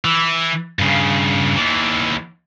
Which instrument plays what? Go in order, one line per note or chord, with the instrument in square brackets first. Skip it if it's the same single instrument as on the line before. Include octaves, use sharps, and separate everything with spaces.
[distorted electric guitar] E3
G2 C#3
D#2 E3